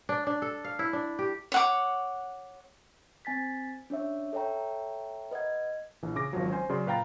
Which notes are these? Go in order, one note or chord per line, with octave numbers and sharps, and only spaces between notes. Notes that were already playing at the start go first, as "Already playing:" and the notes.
D4
D4
A4
F5
E4
D4
G4
C#5 F#5 D6
C4 G#5 A6 B6
C#4 D4 C#5 E5
A4 C#5 E5 G5 A#5
B4 D#5 F#5 G#6
A#1 E3
C#3 D6 A#6
G#1 F3 F#3
C#4 C5 G#5
C#3 F#3 D5 C6
A#2 B4 F5 G5 A#5 A6